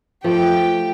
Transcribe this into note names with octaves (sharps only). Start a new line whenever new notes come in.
F3 A3 G4 G5